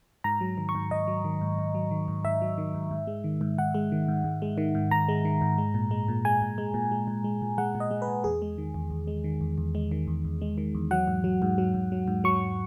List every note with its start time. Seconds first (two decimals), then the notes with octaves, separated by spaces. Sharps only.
0.24 G#2 A#5
0.41 F#3
0.58 D#3
0.69 C#6
0.75 G#2
0.91 G#2 D#5
1.07 F#3
1.24 D#3
1.41 G#2
1.59 G#2
1.75 F#3
1.91 D#3
2.08 G#2
2.24 G#2 E5
2.42 F#3
2.58 D#3
2.74 G#2
2.91 G#2
3.07 G#3
3.24 D#3
3.41 G#2
3.58 G#2 F#5
3.74 G#3
3.92 D#3
4.08 G#2
4.24 G#2
4.42 G#3
4.58 D#3
4.75 G#2
4.91 G#2 A#5
5.09 G#3
5.25 D#3
5.41 G#2
5.58 G#3
5.74 A#2
5.91 G#3
6.08 A#2
6.25 G#3 G#5
6.42 A#2
6.58 G#3
6.74 A#2
6.91 G#3
7.08 A#2
7.24 G#3
7.42 A#2
7.58 G#3 F#5
7.75 A#2
7.80 D#5
7.91 G#3
8.02 B4
8.08 A#2
8.24 E2 G#4
8.42 G#3
8.58 D#3
8.74 E2
8.91 E2
9.08 G#3
9.24 D#3
9.41 E2
9.58 E2
9.75 G#3
9.91 D#3
10.07 E2
10.25 E2
10.42 G#3
10.58 D#3
10.75 E2
10.91 F#3 F#5
11.07 G#2
11.24 F#3
11.42 G#2
11.58 F#3
11.74 G#2
11.92 F#3
12.08 G#2
12.24 F#3 C#6